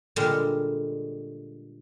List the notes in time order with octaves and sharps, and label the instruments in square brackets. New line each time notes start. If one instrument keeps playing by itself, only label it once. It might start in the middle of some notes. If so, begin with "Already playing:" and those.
[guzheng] A#2 D3 G3 G#3 D4 A#4